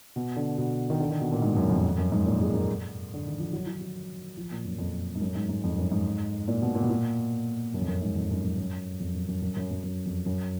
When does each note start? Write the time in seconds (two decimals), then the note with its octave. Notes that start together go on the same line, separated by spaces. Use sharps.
0.16 B2
0.36 D3
0.58 B2
0.90 D#3
1.00 D3
1.10 D#3
1.21 B2
1.32 A#2
1.42 G#2
1.56 F#2
1.70 F2
1.85 F2
1.98 F#2
2.12 G#2
2.26 A#2
2.41 G#3
2.54 A#3
3.14 D3
3.27 D#3
3.39 F3
3.53 F#3
3.67 F#3
3.81 F#3
4.37 F3
4.52 A#2
4.65 F#2
4.78 F2
5.15 G#2
5.21 F#2
5.35 G#2
5.49 G#2
5.64 F2
5.78 F#2
5.92 G#2
6.48 A#2
6.62 B2
6.75 A#2
6.82 B2
6.89 A#2
7.74 F#2
7.82 F2
7.88 F#2
8.02 G#2
8.16 F2
8.31 F#2
8.44 F#2
8.57 F#2
9.00 F2
9.14 F#2
9.28 F#2
9.42 F#2
9.56 F#2
9.71 F#2
9.84 F#2
10.06 F2
10.26 F#2